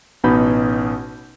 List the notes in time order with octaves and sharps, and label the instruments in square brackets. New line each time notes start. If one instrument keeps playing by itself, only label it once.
[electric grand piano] A1 B2 B3 D#4 B5 G6